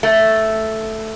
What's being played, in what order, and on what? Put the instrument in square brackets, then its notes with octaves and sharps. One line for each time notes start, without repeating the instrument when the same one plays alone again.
[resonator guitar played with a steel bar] A3